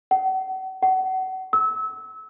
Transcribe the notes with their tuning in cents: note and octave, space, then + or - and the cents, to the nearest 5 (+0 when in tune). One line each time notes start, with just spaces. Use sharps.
F#5 +40
F#5 +30
E6 -30